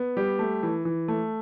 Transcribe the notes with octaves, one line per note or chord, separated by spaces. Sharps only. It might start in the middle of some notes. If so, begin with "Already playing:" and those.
Already playing: B3
G3 G4
A3
E3
E3
A3